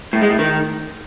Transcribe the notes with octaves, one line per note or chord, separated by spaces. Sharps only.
A2
G#3
A2
D#3